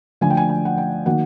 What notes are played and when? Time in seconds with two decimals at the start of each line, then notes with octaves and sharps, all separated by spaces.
0.21 D3 F3 A3 G#5
0.30 G5
0.37 G#5
0.49 G#5
0.65 F#5
0.78 G5
1.06 D#3 F#3 A#3 F#5